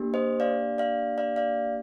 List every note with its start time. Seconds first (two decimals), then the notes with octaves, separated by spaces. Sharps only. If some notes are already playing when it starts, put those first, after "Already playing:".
Already playing: A#3 D4 G4
0.14 C5 D#5
0.40 D5 F5
0.78 D5 F5
1.18 D5 F5
1.36 D5 F5